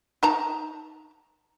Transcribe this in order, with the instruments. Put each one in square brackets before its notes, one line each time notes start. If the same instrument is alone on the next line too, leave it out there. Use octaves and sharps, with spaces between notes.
[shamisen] D#4 A5 A#5